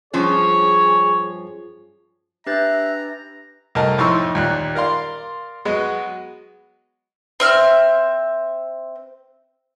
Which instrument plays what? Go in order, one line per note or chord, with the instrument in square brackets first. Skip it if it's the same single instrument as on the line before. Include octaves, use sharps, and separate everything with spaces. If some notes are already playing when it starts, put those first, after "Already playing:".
[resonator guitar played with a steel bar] G2 F3 C#4 [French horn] G#4 [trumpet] C#5
[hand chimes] D4 B4 G6 [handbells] G4 F#6 A6 [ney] E5 [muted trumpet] A#5
[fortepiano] C2 A3 A#4 D#5 A5
F2 A2 D#4 C6 C#6 E6
D#2 A#2 F#6
A#4 D5 F5 C6
F#3 G#3 B3 F#4 D#5
[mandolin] C4 E5 F6